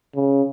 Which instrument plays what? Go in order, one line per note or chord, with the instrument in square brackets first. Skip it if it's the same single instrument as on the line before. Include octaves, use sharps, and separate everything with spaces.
[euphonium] C#3